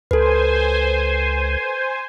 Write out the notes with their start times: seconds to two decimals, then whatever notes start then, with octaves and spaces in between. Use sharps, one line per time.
0.11 C#2 A4 B4 C5 G#5